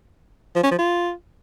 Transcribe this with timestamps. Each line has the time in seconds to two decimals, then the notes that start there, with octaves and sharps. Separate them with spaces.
0.56 F3
0.63 C#4
0.71 F3
0.79 F4